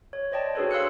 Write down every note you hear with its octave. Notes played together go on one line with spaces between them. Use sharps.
C#5
C5 D5 D#5 G5 A5
D4 F#4 G#4 A4 B4 C#5
F5 C6 E6 F#6 C#7